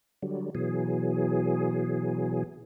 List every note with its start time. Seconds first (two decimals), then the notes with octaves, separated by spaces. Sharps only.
0.23 D3 F#3 G3
0.55 B2 E3 F#3 G#4